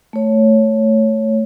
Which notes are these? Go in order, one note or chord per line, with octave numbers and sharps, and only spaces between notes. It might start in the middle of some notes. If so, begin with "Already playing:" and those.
A3 C#5